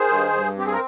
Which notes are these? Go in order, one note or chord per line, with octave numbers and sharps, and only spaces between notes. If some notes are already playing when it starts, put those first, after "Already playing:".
Already playing: D#3 G#4 C5
G2
G2
C4 G4
G#4
A#4